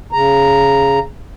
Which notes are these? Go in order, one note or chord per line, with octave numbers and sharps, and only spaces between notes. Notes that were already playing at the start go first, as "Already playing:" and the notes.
C#3 A#5